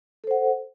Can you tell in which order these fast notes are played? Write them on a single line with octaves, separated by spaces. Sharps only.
A4 C5 F#5